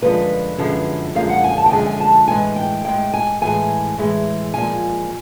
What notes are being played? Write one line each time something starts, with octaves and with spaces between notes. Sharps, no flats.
F#2 D3 F3 G#3 B4
F#2 D3 F3 G#3
F#2 D3 F3 G#3 F5
F#5
G#5
A5
G5
F#2 D3 F3 G#3 G#5
G#5
A5
A2 E3 G#3 G#5
G5
A2 E3 G#3 G5
G#5
A2 E3 G#3 G#5
A2 E3 G#3
A#2 F3 G#3 G#5